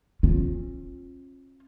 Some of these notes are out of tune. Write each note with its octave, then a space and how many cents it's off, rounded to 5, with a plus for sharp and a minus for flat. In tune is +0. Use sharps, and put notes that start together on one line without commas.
C#4 -40 F4 +15